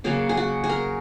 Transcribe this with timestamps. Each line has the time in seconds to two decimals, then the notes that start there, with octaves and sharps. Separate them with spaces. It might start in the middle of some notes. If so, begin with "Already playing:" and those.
0.04 C#3 F#3 A#3 G#4
0.29 G#4
0.37 F#4
0.64 G#4
0.69 A#4